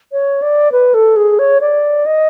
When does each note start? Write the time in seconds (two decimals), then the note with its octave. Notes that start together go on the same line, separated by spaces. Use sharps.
0.12 C#5
0.42 D5
0.72 B4
0.94 A4
1.16 G#4
1.39 C#5
1.61 D5
2.06 D#5